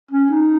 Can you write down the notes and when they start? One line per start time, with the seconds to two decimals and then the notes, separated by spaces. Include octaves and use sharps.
0.11 C#4
0.30 D#4